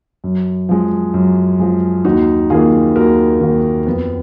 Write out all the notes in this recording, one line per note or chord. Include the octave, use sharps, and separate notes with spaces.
F#2
F3 G#3
F#2
F3 G#3
D#2 D#4 F#4
D#3 A#3 F4 G#4
D#2 F#4 A#4
D#3 A#3
F2 B3